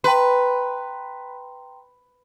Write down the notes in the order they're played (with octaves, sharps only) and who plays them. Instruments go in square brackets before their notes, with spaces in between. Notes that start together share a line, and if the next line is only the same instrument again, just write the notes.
[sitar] B4 [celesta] G5 A#5 C6